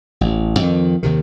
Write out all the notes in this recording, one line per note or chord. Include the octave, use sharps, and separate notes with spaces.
A1
F2 D#3
D#2 C3 D#3